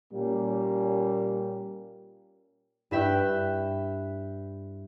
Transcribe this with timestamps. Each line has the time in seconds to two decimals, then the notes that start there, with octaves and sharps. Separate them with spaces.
0.13 A#2 G3 A#3 C#4 G4
2.91 G2 E4 E5 G5 F#6